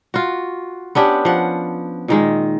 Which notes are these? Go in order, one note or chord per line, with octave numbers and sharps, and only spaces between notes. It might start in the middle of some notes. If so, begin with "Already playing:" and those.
F4 F#4
B3 C#4 D4 G4
F3 F#5
A#2 D#3 G#3